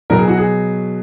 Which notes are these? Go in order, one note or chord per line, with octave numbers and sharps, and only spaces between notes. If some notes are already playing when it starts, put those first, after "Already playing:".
B2 F#3 A#4
G#4
F#4
G#4